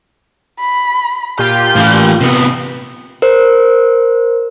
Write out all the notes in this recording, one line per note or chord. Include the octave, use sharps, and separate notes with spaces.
B5
A#2 F4 G4 G6
A2 E3
C3 B3
A#4 C5